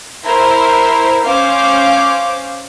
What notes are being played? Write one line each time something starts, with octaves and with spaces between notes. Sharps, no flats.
E4 A#4 C5
C#4 C5 F5 D6